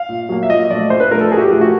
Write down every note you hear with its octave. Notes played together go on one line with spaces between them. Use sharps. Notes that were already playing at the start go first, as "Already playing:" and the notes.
Already playing: F5
A#2
F#3 A#3
E5
A#2 D#5
F3 A3 D5
A#2 C5
B4
F3 A3 A#4
A4
A#2 G#4
F#4
G4
F3 A3
F#4